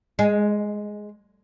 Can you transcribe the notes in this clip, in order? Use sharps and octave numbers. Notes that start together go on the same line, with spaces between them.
G#3